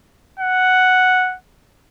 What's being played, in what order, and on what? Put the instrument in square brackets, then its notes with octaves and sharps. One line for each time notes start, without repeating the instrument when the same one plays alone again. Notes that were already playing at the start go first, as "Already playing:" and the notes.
[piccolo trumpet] F#5